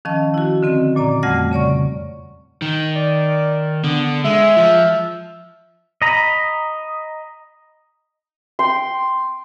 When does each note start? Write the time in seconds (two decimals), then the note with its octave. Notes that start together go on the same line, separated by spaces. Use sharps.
0.05 D#3 F3 C#4 D#5 A5
0.34 E4 F#4
0.63 D3 C4 D#5
0.95 F#2 A#2 D5 A#5
1.23 F2 G3 A3 F#5 F6
1.51 C#3 C#5 D5 C#6
2.62 D#3
2.96 D5
3.84 D3 B3
4.25 G#3 E5
4.56 F3
6.02 D#5 A#5 B5
8.59 G5 C6